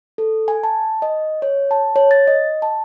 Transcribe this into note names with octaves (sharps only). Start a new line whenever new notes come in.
A4
G#5
A5
D#5
C#5
A5
C#5
A6
D#5
A5